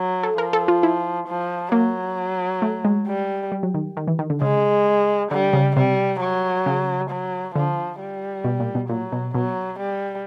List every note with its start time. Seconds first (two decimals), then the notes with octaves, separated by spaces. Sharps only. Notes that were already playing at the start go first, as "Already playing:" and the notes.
Already playing: F#3
0.23 A4
0.38 F3 A#4
0.53 A4
0.68 F4
0.83 E4
1.28 F3
1.72 F#3 A#3
2.62 A3
2.85 G#3
3.07 G3
3.52 G3
3.63 F#3
3.74 D#3
3.97 D#3
4.08 E3
4.19 D#3
4.30 D3
4.42 C#3 G#3
5.31 D3 G3
5.53 C#3
5.76 C3 G3
6.20 F#3
6.66 C#3
7.10 F#3
7.55 D3 F3
8.00 G3
8.44 B2
8.60 A#2
8.75 B2
8.89 A#2 F#3
9.12 B2
9.35 B2 F#3
9.79 G3